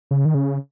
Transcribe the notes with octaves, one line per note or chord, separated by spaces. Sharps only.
C#3
D#3
C#3